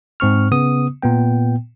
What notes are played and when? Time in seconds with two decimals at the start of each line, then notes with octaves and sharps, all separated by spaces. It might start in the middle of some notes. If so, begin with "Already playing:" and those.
0.20 G#2 C4 C#6 F6
0.51 C#3 B3 D#6
1.03 A#2 B3 G5